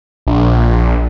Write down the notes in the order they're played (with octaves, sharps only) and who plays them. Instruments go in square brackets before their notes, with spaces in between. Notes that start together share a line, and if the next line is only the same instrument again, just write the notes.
[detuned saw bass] A#1